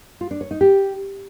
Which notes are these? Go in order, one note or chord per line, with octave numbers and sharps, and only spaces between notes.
F4
D4
C#5
D#4
G4